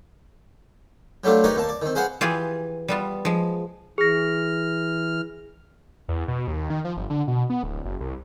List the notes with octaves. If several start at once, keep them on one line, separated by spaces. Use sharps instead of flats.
F#3 G3 A3 D4 F4
D#4 G4 A#4 B4 C#5 D5
D#2 A#3 A5
D5
D#3 C4
G#4 B4 C5 F5 F#5
E3 F4 G4 G#4
G3 B3 F4
F3 G#3
E3 G#4 F6 A#6
E2
B2
D#2
D#3
F3
G1
D3
B2
B3
D1
F#1
C2